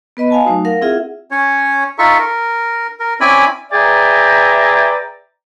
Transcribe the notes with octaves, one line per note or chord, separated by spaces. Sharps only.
B3 B4 D#5 B5
F5 G#5 A5
F#3 A3 D#4 F#4
A#4 F5 F#5
C4 E4 F4 G#4 E5 F#5
C#4 C#5
D#4 F4 A4 E5 C#6
A#4
A#4
C4 C#4 E4 D5 G#5 B5
G#4 B4 D5 E5 G5 A#5